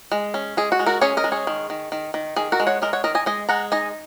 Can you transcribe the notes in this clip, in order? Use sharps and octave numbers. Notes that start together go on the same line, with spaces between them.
G#3
C#4
G#3 G#4
F#4
G#3
F#4 A#4
C#4 G#4 C#5
A#4 D#5
G#3
G#4 C#5
D#3
D#3
D#3
D#3
D#3 G#4
F#4 A#4
G#3
C#5 F#5
G#3 A#4 D#5
C#5 F#5
D#3 A#4 D#5
D#5 G#5
G#3 D#5 G#5
G#3 F#5 A#5
D#4 D#5 G#5